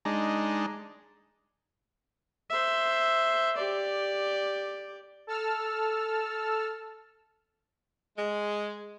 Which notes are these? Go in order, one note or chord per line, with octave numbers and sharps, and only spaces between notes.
G#3 D4 D#4
C5 E5
G4 D5
A4 A5 E6 F6
G#3